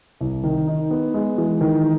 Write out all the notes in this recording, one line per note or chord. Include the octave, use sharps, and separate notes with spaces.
C2
D#3
D#4
B3
G#3
E3
D#3